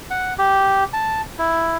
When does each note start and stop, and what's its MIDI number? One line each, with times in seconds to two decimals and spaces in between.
0.11 0.34 78
0.38 0.84 67
0.93 1.22 81
1.39 1.77 64